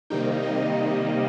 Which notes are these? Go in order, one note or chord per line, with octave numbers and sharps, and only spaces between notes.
C3 D#3 G3 A#3 D#4 G5
D#5